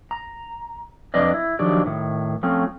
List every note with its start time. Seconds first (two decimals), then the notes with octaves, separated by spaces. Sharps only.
0.11 A#5
1.14 F2 D4 B4 D5 D#5
1.34 E4
1.59 D#3 F3 F#3 D4 G4 D5
1.86 A2 D#3
2.43 F3 A3 C4 C#4